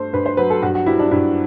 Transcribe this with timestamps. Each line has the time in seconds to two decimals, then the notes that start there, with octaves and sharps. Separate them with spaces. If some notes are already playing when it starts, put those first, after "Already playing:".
Already playing: G2 A3 C5
0.13 G2 B4
0.26 C5
0.37 F#3 B4
0.50 A4
0.62 G2 F#4
0.75 F#4
0.86 G3 E4
0.99 D4
1.11 G2 E4